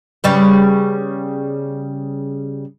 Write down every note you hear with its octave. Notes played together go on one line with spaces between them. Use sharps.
C#3 G3 B3